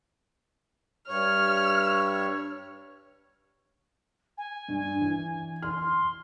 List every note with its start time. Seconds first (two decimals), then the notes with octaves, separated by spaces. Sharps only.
1.08 G2 C#5 F6
4.37 G#5
4.68 G2
5.01 E3
5.62 C6 F6